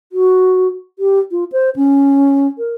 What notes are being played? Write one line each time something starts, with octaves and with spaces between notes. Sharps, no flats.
F#4
G4
F4
C5
C#4
A#4